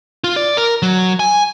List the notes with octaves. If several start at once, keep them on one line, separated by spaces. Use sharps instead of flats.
F4
D5
A#4
F#3
G#5